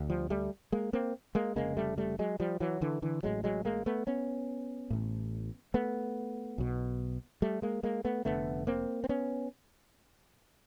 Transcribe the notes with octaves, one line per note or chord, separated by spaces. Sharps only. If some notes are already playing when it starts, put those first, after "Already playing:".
Already playing: D2
F3 G3
G3 A3
G#3 A#3
A#3 C4
G#3 A#3
F1 D#2 C#3 G#3 A#3
G3 A3
G3 A3
F#3 G#3
F3 G3
E3 F#3
D3 E3
D3 E3
A1 A2 F#3 G#3
F#3 G#3
G#3 A#3
A3 B3
B3 C#4
A1 A2
A3 B3
B1 B2
G3 A3
G#3 A#3
G#3 A#3
A3 B3
F1 D#2 D3 A3 B3
A#3 C4
C4
B3 C#4